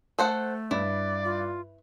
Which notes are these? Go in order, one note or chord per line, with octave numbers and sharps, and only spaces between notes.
A3 A4 C5 F#5
G2 E4 D5
F4